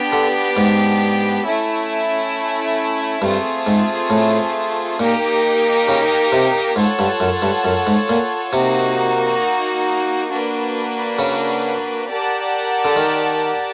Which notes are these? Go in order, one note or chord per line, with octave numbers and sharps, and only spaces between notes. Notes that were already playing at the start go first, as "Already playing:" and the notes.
Already playing: B3 D4 G4
D3
G#2
A3 C#4 E4
G2 A3 C4 F4 G#4
G#2
A2
A#2 A#3 D#4 G4 A#4
C#3
C3
G#2 F4 A4 C#5 F#5 A5
G2
F#2
G2
F#2
G#2
A#2
C3 A#3 D#4 F#4
A#3 D4 F#4 B4
C#3
G4 A#4 D5 F#5 A5
D3
D#3